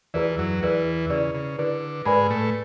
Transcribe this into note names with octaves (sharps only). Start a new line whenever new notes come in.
E2 E3 E4 G#4 B4 D5
F#2 F#3
E2 E3 E4 G#4 B4 D5
C#3 E4 G#4 B4 D5
C#3
D3 E4 G#4 B4 D5
G#2 G#3 G#4 B4 D5 G#5 B5
A2 A3